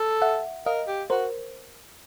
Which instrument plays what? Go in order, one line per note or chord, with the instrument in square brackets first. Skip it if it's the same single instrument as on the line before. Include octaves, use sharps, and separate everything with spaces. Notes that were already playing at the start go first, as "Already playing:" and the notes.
Already playing: [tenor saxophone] A4
[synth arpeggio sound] E5 F#5
[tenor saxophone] A#4 [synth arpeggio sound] D#5 F5
[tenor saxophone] G4
[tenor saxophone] F#4 [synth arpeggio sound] A#4 C5